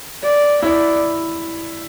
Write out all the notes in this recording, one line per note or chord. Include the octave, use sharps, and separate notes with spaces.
D5
E4 D5